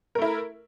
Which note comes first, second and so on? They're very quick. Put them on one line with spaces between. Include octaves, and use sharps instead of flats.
A#4 A3 E4